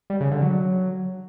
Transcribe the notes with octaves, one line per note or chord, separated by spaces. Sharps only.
G3
C#3
D3
F#3